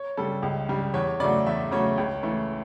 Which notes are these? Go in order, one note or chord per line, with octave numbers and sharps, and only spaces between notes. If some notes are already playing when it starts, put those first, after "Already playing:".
Already playing: C#5
C#3 G3 A4
C#2
C#3 G3
E2 C#5
C#3 F#3 A3 D5
E2 E5
C#3 F#3 A3 C#5
C#2
C#3 E3 A3